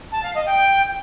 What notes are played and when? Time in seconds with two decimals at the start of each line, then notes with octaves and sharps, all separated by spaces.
0.12 A5
0.23 F5
0.35 D#5
0.46 G5